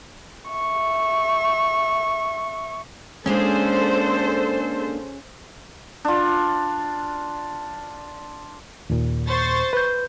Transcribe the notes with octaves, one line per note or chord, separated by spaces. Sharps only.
E5 C#6
G#3 A#3 C#4 D4 G#4 A4 C5
D4 F4
D#2 A#2
C5 C#6 A6
B4 G6